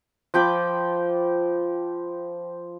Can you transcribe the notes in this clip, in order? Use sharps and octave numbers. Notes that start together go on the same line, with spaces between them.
F3 G5 B5 D6